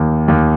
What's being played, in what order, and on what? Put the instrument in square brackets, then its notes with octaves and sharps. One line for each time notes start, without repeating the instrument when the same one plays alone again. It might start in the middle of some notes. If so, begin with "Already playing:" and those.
Already playing: [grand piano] D#2
D#2